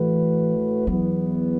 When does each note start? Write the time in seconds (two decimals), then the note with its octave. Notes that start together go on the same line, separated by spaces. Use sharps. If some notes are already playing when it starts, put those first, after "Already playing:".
Already playing: A2 E3 A3 F#4 B4
0.87 E2 E3 F#3 B3